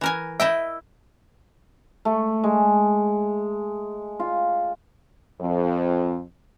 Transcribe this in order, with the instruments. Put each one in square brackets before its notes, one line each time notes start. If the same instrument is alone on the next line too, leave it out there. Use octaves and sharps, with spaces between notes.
[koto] E3 A#4 G#5
[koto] E4 D#5 G5 [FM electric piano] E5
[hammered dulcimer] A3
G#3
F4
[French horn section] F2